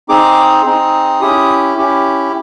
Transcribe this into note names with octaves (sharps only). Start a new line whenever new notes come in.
C4 D#4 G#4 D6
C4 D#4 G#4
C#4 E4 G4 D#6
C#4 E4 G4